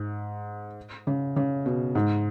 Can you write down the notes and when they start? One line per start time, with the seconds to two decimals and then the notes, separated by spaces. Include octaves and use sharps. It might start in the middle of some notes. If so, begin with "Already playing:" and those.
Already playing: G#2
1.07 C#3
1.36 C#3
1.66 B2
1.95 G#2